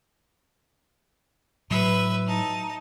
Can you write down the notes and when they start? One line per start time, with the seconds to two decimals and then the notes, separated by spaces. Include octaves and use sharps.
1.71 A2 F#3 B4 E5
2.27 D#4 A5